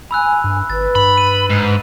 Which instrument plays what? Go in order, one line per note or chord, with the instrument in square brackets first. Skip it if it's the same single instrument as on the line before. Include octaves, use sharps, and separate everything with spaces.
[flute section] G#5 [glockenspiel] B5 E6 F#6
[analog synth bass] G2
[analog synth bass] G#1 [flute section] B4 [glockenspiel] A6
[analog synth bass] G2 [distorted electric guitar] B5
[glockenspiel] D#7
[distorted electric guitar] G#2